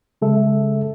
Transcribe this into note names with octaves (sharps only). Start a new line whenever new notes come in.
C#3 G#3 A4 E5